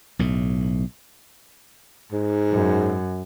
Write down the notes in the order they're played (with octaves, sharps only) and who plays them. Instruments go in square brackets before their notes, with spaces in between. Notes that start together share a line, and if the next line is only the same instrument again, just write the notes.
[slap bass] B1 A2
[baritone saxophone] G#2
[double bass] F#2